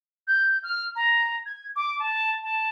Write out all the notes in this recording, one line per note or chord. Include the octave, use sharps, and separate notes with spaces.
G6
F6
A#5
G#6
D6
A5
A5